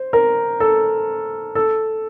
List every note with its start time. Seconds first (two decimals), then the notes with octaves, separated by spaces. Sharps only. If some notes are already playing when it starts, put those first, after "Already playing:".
Already playing: C5
0.13 A#4
0.60 A4
1.55 A4